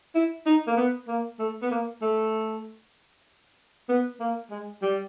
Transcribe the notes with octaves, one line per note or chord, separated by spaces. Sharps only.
E4
D#4
A#3
B3
A#3
A3
B3
A#3
A3
B3
A#3
G#3
G3